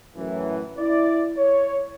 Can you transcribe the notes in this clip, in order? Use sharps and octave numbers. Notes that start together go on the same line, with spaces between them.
F#2 A2 E3
E4 D5
C#5